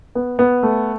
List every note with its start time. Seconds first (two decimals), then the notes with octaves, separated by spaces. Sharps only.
0.15 B3
0.39 B3
0.63 A3